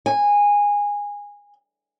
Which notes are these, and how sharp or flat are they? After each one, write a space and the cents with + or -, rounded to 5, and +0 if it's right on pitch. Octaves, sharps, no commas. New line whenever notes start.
G#5 -20